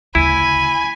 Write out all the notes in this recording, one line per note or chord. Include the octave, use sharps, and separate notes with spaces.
D2 C#3 E4 G#5 B5